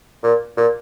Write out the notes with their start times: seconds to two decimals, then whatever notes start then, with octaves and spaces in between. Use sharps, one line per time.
0.23 A#2
0.57 A#2